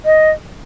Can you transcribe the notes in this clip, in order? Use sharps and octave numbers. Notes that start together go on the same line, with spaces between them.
D#5